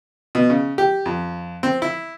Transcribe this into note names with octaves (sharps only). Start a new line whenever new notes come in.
B2
C#3
G4
F2
C4
E4